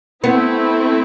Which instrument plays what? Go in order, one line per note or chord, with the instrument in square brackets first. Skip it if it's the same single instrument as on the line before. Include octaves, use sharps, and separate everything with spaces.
[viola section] A3 C4 E4 [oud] B3